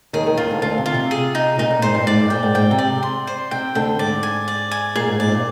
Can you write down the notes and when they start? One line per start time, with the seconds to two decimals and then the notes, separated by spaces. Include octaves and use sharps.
0.13 D#2 D#3 G#4
0.26 D#2 D#3
0.37 D#2 D#3 F4
0.49 D2 D3
0.62 D2 D3 F4
0.78 C3
0.86 F4
0.94 C3
1.11 G#4
1.35 D#4
1.58 A#2 D#4
1.71 A#2
1.82 G#2 C5
1.94 G2
2.07 G#2 D5
2.19 G#2
2.30 A#2 G5
2.43 G#2
2.54 G#2 G5
2.71 C3
2.78 D5
3.03 C6
3.27 C5
3.51 C3 G5
3.75 D2 D3 G5
3.99 G#2 D5
4.23 G#5
4.48 D5
4.71 G#5
4.96 A#2 G#4
5.08 G#2
5.20 G#2 D5
5.28 C3
5.32 A#2